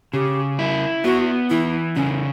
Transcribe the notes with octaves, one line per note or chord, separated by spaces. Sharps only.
C#3 G4
E4
B3 F#4
E3 E4
C#3 C#4